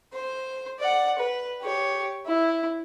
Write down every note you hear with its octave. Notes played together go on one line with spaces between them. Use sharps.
C5
D5 F#5
B4
G4 C#5
E4